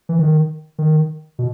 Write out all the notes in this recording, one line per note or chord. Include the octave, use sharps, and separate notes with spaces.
E3
D#3
D#3
B2